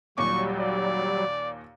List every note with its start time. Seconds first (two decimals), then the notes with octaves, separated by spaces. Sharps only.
0.17 D#2 A#2 F#3 G3 C#6 D6
0.58 D5